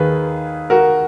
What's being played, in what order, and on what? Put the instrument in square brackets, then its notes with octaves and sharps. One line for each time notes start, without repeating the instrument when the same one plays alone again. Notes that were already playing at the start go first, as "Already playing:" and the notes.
Already playing: [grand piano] D#2 D#3 G#4 B4
F#4 A#4